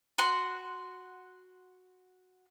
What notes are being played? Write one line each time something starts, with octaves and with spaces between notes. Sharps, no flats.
F#4 F#5 C6